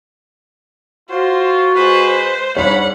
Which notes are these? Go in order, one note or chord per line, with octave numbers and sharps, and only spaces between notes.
F4 F#4 C5
G#3 B4 C5
G#2 G3 D4 C#5 F5 F#5 B5